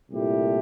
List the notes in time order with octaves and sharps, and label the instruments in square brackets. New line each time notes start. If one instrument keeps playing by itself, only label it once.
[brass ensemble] C2 A#2 A3 E4 G4